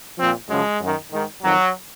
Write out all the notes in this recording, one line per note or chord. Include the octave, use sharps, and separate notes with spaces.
A#2 F3 C4
F#2 C#3 F3 G#3
F#2 D#3
G#2 D#3
F2 D#3 F#3